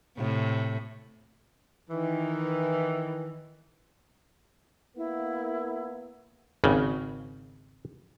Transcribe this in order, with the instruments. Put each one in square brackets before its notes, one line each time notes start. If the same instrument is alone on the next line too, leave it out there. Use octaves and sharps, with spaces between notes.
[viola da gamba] A2 C3
[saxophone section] D#3 E3
[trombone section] A#3 B3 [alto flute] E4
[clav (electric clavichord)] G#1 C#3